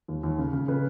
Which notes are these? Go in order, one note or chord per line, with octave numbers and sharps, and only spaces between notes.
D#2
D#2
C#3
C#3
C#3 B4